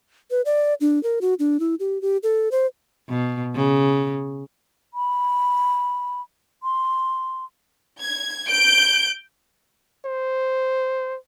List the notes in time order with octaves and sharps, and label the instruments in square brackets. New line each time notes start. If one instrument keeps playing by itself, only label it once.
[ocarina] B4
D5
D4
A#4
F#4
D4
E4
G4
G4
A4
C5
[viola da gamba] B2
C#3
[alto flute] B5
C6
[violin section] G#6
G6 D7
[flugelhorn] C5